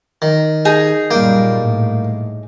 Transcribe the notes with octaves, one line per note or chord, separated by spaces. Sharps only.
D#3
D#4 G#4
F#2 A#2 G3 A#3 G5
A2